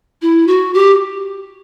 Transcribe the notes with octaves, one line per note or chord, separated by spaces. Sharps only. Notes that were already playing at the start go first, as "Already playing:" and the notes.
E4
F#4
G4